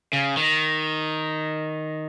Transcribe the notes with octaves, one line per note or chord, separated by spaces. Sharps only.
C#3
D#3